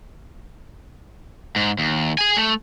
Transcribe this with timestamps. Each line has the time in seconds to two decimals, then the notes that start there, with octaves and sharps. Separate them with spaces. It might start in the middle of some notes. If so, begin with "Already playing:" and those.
1.56 G#2
1.79 D#2
2.19 G#4 G#5
2.37 A3